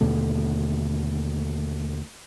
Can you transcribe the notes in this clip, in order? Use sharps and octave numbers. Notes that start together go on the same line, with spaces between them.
D#2 B2 D3 A3